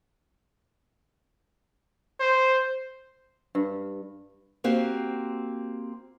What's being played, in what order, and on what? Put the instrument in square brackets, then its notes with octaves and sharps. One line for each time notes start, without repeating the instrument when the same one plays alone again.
[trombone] C5
[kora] G2
[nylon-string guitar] A#3 C4 F#4 G4